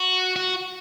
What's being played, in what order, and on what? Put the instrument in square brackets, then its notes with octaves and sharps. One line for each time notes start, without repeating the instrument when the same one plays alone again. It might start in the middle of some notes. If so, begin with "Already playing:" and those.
Already playing: [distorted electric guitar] F#4
F#4